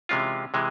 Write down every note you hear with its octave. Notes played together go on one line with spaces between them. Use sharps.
C3 E3 G#3 C#4 F4
C3 E3 G#3